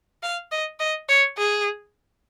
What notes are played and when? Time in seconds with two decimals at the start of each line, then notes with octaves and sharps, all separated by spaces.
0.23 F5
0.51 D#5
0.80 D#5
1.09 C#5
1.38 G#4